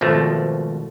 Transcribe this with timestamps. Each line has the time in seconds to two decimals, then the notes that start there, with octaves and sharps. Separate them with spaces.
0.01 G#1 B2 F3 A3